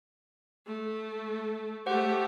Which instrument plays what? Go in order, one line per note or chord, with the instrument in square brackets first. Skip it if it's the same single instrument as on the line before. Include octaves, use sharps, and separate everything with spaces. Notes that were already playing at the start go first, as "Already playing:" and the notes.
[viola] A3
[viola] A3 G4 [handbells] C5 F#5